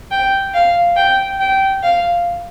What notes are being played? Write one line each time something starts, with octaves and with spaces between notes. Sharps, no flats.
G5
F5
G5
G5
F5